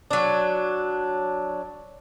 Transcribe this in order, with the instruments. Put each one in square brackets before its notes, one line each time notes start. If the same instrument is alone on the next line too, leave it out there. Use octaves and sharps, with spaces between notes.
[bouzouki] F#3 D4